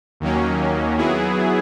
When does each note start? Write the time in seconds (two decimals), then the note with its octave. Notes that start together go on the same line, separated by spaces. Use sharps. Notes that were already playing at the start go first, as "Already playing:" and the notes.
0.20 D#2 D#3 F#3 A#3 C#4
0.98 F#3 B3 E4 G#4